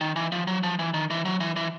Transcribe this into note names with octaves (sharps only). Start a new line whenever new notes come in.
D#3
E3
F3
F#3
F3
E3
D#3
E3
F#3
E3
E3